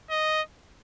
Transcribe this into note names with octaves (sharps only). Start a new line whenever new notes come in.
D#5